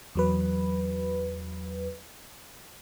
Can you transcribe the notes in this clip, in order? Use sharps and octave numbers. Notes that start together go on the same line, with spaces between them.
E2 F#3 B4